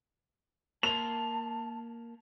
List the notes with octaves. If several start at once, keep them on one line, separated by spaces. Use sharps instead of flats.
A#3 A#4 A5 C6 F7